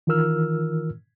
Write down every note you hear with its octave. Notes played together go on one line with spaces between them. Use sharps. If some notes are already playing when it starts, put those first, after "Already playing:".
D#3 E3 F4 A#4 E6 F6